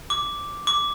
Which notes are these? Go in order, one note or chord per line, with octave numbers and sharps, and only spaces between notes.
D6
D6